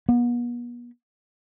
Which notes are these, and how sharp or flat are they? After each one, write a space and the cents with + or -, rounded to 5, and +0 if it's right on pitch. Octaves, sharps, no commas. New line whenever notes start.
B3 -40